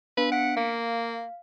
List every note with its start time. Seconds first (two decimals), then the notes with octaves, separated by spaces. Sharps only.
0.17 B3 D4 B4 F5
0.32 F#5 B6 C#7 D7
0.57 A#3 F5